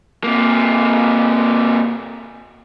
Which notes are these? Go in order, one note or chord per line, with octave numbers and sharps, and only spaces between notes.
C3 A#3